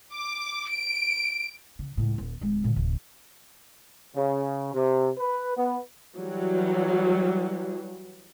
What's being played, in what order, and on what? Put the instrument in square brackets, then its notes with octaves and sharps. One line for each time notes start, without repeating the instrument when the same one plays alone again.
[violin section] D6
D7
[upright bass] C#3
C#2 A2
D#1
D1 G#3
A#2 D3
D1 C3
[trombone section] C#3
C3
B4
B3
[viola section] E3 F#3 G3